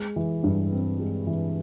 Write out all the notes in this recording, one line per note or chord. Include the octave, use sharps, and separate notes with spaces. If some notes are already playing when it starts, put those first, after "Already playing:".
Already playing: G#3
E3
G2
C4
G#3
E3